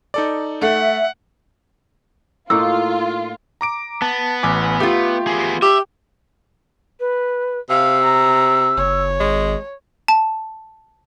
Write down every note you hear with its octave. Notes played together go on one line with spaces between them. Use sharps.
D#4 A4 D5
A3 E5 F#5
A2 A#3 D#4 F4 E6
A#5 D6 D7
B3 A5
A1 G#5 D6
A3 F4 G4
B3 G#4
G4 E5
B4
C3 F5 E6
A#5
F#1 C#5
G#1 G#3
A5